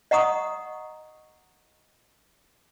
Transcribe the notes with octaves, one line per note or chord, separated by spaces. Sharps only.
D#5 F#5 A#5 C#6 D#6